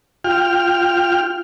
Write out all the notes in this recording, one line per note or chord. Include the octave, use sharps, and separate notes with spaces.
F4 G5 F6